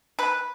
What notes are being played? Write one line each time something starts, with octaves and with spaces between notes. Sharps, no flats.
B4